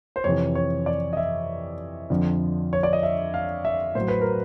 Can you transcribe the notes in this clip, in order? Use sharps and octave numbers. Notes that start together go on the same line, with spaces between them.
C5
F2 C3 E3 C#5
C#5
D5
D#5
E5
F2 D3 F3
C#5
D5
D#5
E5
F5
E5
A2 F#3 C5
B4
A#4